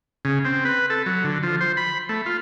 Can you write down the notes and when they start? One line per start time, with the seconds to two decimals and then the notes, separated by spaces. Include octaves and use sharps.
0.25 C#3
0.45 C4
0.65 B4
0.90 A4
1.06 F#3
1.24 D3
1.43 F3
1.60 C5
1.77 B5
2.09 A3
2.26 F4